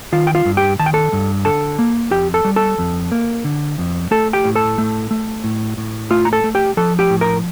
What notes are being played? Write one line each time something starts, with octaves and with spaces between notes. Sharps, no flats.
D#3 F4 F5
G5
F4 F5
G2
G4 G5
D#3 A5
G5
A4 A5
G2
D3 A4 A5
A#3
F2 G4 G5
A4 A5
G3
A4 A5
F2
A#3
D3
F2
A3 A4 A5
G4 G5
A2
A4 A5
A3
A3
A2
A2
A3 F4 F5
A#5
A4 A5
A3
G4 G5
F3 A4 A5
G4 G5
A2
A#4 A#5